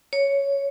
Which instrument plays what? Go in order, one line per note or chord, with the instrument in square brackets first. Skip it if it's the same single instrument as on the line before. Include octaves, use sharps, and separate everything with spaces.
[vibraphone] C#5